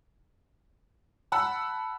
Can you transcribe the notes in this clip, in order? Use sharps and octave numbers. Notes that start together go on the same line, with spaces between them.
F#5 A5 B5 E6